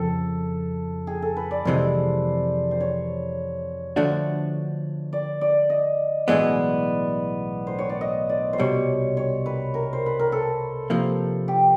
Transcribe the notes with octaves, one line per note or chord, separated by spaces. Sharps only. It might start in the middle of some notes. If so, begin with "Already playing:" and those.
Already playing: F2 C#3 F3 A4
G#4
A4
B4
D5
F2 C3 E3 G#3 C5
C5
C#5
D3 F3 A3 D4 F#4
D5
D5
D#5
B1 A2 E3 G#3 B3 D5
C5
C#5
D5
D#5
D5
C5
C2 B2 G3 C#5
C#5
B4
A#4
C5
B4
A#4
A4
C3 F3 A#3
G4